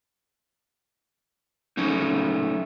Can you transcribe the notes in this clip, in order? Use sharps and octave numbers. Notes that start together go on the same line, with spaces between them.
F3 A3 C#4 D#4